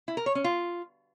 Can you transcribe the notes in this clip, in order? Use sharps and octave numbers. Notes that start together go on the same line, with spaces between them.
E4
A#4
C#5
C#4
F4